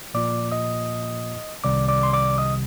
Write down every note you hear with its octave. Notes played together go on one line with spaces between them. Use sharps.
A#2 F3 A#3 F4 D5 D6
D#5 D#6
C2 C3 D#3 G3 D5 D6
D5 D6
C6
D5 D6
D#5 D#6